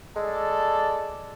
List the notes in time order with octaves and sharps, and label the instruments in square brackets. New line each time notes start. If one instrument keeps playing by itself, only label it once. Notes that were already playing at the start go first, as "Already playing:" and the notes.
[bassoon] G#3 [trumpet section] A4 D5